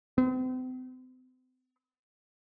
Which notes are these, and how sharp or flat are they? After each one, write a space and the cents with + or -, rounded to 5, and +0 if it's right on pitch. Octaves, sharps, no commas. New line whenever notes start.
C4 -40